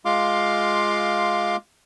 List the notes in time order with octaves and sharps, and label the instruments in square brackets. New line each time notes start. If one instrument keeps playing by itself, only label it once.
[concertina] G#3 F4 F5 C6 D6